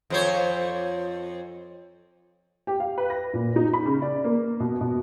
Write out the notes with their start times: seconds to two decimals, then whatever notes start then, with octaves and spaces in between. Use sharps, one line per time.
0.10 F2 C5 C#5
2.67 G4
2.80 F5
2.98 B4
3.10 A#6
3.34 A#2
3.56 D#4
3.73 B5
3.85 C#3
4.02 D5
4.24 A#3
4.60 B2
4.81 B2